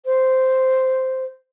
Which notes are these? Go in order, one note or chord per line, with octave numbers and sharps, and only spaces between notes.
C5